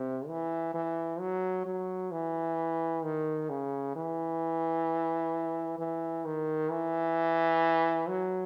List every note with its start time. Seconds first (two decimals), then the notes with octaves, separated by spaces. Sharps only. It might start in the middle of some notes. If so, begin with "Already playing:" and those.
Already playing: C3
0.28 E3
0.74 E3
1.20 F#3
1.66 F#3
2.12 E3
3.04 D#3
3.50 C#3
3.96 E3
5.79 E3
6.25 D#3
6.70 E3
8.09 F#3